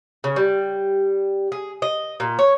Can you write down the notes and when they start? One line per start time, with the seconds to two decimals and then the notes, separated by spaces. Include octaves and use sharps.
0.24 C#3
0.36 G3
1.52 G#4
1.82 D#5
2.20 A#2
2.39 C#5